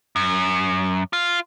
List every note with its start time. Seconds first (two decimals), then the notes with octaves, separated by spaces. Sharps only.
0.16 F#2
1.13 F4